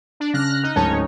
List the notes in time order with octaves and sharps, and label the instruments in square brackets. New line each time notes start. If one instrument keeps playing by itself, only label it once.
[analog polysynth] D4
[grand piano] C#3 [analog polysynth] F6 F#6 A#6
[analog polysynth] D#4 [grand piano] F#6
[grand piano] D1 G#2 A5 [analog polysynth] C#4 D#4 C#5